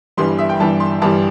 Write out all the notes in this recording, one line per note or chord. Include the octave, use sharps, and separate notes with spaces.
G1 G2 E3 G3 C6
E5
G5
G1 G2 E3 G3 A5
C6
G1 G2 E3 G3 A5